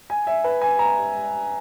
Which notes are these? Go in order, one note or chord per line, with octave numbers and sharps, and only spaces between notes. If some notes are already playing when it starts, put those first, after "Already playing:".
G#5
E5
B4
G#5
A#5